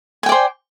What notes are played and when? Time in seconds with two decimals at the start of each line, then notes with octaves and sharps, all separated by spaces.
0.23 G#5
0.26 G5
0.29 D5
0.32 C5